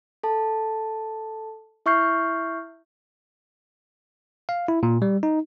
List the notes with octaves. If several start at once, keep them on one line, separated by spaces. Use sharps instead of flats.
A4 A5
E4 E5 C#6 F6 G6 C7
F5
E4
A#2
G3
D#4